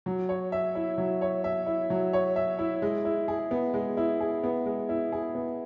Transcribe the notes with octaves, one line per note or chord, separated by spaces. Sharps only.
F#3
C#5
E5
E4
F#3
C#5
E5
E4
F#3
C#5
E5
E4
G#3
E4
G#4
B3
G#3
E4
G#4
B3
G#3
E4
G#4
B3